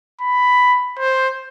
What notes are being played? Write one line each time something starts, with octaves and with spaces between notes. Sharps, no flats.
B5
C5